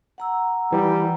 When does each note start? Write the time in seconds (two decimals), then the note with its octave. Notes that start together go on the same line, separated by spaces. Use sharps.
0.18 F#5 A#5 E6
0.72 E3 G3